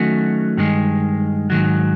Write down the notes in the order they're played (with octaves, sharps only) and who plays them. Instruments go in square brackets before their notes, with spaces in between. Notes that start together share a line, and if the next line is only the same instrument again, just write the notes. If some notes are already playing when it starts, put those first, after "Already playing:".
Already playing: [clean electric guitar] D#3 F#3 A3 C#4 F#4
G2 D#3 G#3
G#2 D#3 F#3